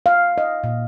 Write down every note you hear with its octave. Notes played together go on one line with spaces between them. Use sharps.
F5
D#5
A#2